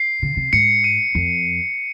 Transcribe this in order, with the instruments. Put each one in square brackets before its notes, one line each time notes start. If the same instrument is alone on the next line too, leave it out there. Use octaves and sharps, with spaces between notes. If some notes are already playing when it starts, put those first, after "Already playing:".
Already playing: [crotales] C7
[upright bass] C#3
C3
[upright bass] G#2 [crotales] C#7
[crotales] D#7
[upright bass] F2